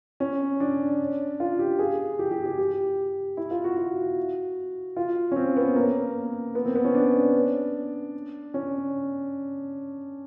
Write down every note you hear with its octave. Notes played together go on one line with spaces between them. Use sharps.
C#4
D4
F4
G4
G#4
G4
G4
G4
G4
E4
F4
F#4
F#4
F4
C#4
C4
B3
A#3
B3
C4
B3
C#4
D4
C#4